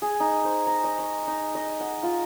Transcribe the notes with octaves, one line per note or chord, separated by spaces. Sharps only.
G#4
D#4
C5
A#5
D#5
C#6
D#4
D#5
F#5
F4